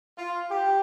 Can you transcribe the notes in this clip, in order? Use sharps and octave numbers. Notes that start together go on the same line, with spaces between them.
F4
G4